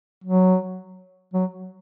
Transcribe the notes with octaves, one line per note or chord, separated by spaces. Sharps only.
F#3
F#3